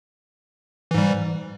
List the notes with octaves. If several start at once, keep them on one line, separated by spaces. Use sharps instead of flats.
G#2 E3 G3